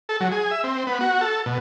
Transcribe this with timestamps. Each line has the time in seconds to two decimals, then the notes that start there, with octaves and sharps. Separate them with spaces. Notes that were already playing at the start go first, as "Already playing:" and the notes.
0.09 A4
0.20 F#3
0.32 G#4
0.51 E5
0.64 C4
0.87 B3
1.01 F#4
1.21 A4
1.46 B2